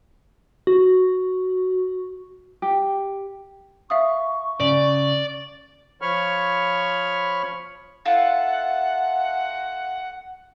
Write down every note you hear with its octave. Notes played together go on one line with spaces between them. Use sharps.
F#4
G4
E5 F5 C#6 D#6
C#3 D5
F3 C#5 B5 C#6 F6
E4 F4 A4 F#5